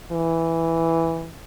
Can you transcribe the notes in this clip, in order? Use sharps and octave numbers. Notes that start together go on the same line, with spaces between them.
E3